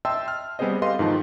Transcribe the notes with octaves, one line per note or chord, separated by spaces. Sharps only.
D#5 E5 G5 A5 C6 E6
F6
G3 B3 C4 G#4 C5 D#5
G4 A4 B4 D#5 F5 C6
G#2 D#3 F3 A5